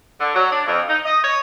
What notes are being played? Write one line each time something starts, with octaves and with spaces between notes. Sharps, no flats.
D3
F#3
D4
F2
D#4
D#5
C#5